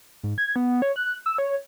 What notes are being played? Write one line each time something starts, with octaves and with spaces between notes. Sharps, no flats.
G#2
G#6
B3
C#5
F#6
E6
C#5